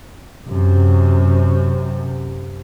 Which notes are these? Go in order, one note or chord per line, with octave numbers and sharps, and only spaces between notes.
F#2 C3